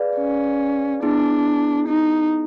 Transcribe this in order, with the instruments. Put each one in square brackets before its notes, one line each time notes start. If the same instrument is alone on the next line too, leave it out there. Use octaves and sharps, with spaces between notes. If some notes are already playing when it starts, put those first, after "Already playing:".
Already playing: [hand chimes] G#4 B4 D5 F5
[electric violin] C#4
[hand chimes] B3 E4 G#4 [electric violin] D4
[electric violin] D#4